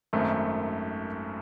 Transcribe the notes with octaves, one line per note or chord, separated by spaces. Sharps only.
G#1 F#2 D#3 A3